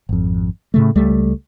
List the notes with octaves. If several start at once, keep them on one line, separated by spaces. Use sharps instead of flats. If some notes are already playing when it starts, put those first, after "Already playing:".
G#1 F2
A2 C#3 A3
C#2 G3 A3